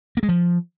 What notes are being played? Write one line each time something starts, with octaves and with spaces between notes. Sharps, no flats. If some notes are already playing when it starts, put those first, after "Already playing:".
A#3
G#3
F3